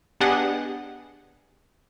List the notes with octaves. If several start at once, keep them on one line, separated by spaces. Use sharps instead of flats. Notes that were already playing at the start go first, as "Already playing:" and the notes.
B3 D4 G4 G#4 D#5 F#5